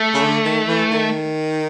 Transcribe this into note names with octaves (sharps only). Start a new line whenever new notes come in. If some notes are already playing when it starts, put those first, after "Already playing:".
Already playing: A3
C#3
D3
D#3
E3
D#3